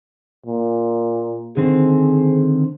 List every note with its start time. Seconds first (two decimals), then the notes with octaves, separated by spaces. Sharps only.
0.46 A#2
1.57 D3 D#3 C4 G#4